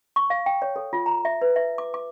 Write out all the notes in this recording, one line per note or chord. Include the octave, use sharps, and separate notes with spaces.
C#6
F5
G5
C#5
A4
F4
A#5
E5
B4
E5
D6
D6